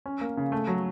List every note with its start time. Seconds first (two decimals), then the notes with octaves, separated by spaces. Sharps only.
0.06 C#4
0.21 A#3
0.37 C#3
0.52 A3
0.67 F#3